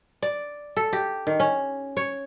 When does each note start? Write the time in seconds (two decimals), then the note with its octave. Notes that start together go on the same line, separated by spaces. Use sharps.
0.22 D5
0.77 A4
0.93 G4
1.27 D#3
1.40 C#4
1.97 C#5